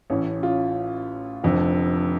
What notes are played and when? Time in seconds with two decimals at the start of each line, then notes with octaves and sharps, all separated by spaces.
0.10 A1 A2 C#4
0.43 F4
1.43 F1 F2 D3